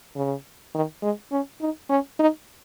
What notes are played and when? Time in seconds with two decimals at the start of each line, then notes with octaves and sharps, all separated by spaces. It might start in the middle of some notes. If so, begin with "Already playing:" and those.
0.16 C#3
0.75 D#3
1.03 G#3
1.32 C#4
1.61 D#4
1.90 C#4
2.19 D#4